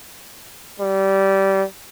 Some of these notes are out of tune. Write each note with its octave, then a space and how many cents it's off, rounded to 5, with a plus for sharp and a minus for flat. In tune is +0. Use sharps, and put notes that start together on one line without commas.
G3 -20